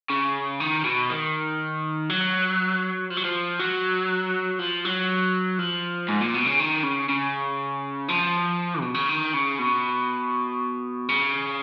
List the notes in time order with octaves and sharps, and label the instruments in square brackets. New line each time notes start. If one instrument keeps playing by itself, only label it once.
[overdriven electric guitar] C#3
D#3
B2
D#3
F#3
F3
F#3
F3
F#3
F3
F#3
F3
G#2
A#2
B2
C#3
D#3
C#3
C#3
F3
B2
C#3
D#3
C#3
B2
C#3